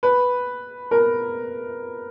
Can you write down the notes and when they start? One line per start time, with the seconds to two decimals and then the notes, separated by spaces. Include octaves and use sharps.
0.03 B4
0.91 A#4